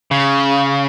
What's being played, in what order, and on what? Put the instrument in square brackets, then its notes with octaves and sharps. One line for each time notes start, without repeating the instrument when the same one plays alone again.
[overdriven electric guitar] C#3